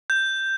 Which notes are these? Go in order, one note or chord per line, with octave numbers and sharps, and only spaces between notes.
G6